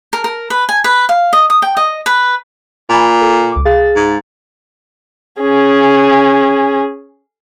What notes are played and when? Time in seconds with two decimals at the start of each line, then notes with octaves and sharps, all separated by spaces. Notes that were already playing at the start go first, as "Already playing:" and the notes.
0.13 A#4
0.24 A#4
0.50 B4
0.69 G#5
0.84 B4
1.09 F5
1.33 D#5
1.50 D#6
1.62 G5
1.77 D#5
2.06 B4
2.89 A#2 G#5 B5
3.21 A4
3.52 C#2 D6
3.65 G#4 F5 A6
3.96 G#2
5.41 C#4 G#4